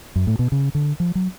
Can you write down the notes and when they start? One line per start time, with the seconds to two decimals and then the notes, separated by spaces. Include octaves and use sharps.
0.16 F#2
0.27 A2
0.39 B2
0.52 C#3
0.75 D3
1.00 F3
1.15 F#3